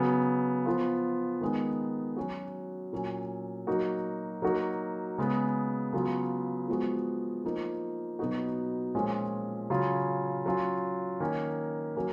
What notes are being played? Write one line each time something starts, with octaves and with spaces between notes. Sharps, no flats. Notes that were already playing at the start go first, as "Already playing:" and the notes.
Already playing: C#3 F#3 B3
F3 B3 F4
D#3 G#3 B3 D#4
F#3 C#4 F#4
A#2 F#3 C#4
F#3 A#3 D#4 F#4
F#3 A#3 D#4 F#4
C#3 G#3 B3
C#3 F#3 B3 F4
F3 G#3 B3 F#4
F3 A#3 D#4
B2 F#3 B3 D#4 F#4
A#2 F3 G#3 C#4 F4
C#3 F#3 C#4 F4
F#3 C#4 F4
D#3 A#3 C#4
F#3 A#3 C#4